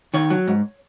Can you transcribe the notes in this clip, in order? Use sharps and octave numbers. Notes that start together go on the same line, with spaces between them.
D#3 C#5
F#3
G#2